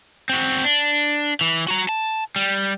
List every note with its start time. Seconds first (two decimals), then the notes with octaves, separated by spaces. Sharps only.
0.29 C4 F#4
0.64 D4
1.41 E3
1.68 F#4 A#5
1.89 A5
2.36 G3